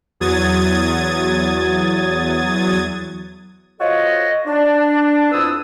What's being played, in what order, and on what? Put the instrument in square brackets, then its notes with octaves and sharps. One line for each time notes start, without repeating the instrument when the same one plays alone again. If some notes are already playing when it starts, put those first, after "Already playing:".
[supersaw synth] E2 F#3 D#6 G#6 A6
[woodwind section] F4 F#4 A4 C5 C#5 D#5
D4
F2 B3 E4 D#6 E6